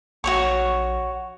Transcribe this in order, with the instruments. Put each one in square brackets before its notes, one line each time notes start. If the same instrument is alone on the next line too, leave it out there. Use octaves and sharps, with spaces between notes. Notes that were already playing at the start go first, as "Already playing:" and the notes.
[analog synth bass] A#1 [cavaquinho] F#4 C#5 C#6